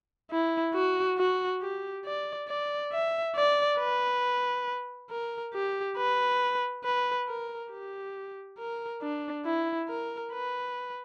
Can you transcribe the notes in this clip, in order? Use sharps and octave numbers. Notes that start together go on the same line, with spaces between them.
E4
F#4
F#4
G4
D5
D5
E5
D5
B4
A#4
G4
B4
B4
A#4
G4
A#4
D4
E4
A#4
B4